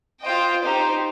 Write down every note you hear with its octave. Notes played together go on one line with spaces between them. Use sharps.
F4 C5 D#5 G5
D#4 G4 C5